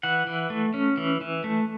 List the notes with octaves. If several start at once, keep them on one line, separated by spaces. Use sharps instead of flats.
E3 F#5
E3
A3
C#4
E3
E3
A3